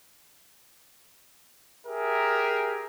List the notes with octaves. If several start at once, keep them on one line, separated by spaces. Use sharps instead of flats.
G4 G#4 A#4 E5